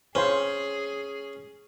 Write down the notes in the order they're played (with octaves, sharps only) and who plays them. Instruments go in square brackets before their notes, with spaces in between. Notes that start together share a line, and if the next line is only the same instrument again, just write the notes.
[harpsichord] C#4 [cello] G#4 [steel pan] B4 C5 F5